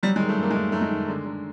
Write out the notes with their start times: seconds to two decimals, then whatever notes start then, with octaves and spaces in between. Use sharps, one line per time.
0.03 F#3 G3
0.16 G#3
0.21 D#3
0.29 A3
0.38 F#2 A#3
0.51 G#3
0.56 D#3 A3
0.72 F#2 A3
0.81 G#3
0.91 D#3
1.08 D3
1.26 D3